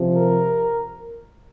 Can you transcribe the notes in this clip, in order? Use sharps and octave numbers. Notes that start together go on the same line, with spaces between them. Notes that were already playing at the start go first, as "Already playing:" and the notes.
Already playing: C3 F3
A#4